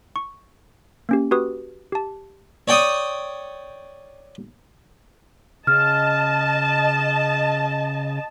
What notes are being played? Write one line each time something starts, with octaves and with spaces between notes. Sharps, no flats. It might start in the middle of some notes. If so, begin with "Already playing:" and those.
C#6
A#3 C#4 G4
F#4 G4 B4 D#6
G4 A5
C#5 D5 G5 C#6 D#6
C#3 D#5 A5 F6